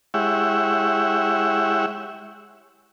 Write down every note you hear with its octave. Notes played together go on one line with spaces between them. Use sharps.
G#3 E4 G4 C#5 E5 F#5